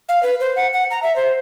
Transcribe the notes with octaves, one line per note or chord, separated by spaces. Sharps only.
F5
B4
C5
F#5
F#5
A#5
E5
C5